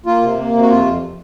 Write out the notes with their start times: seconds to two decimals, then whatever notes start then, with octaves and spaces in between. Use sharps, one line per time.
0.06 A#3 F4
0.22 C3
0.38 A#3
0.53 C3
0.62 F#4
0.70 F2 F4
0.86 F2